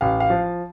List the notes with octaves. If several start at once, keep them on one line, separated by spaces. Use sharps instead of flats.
A1 F5
F5
F3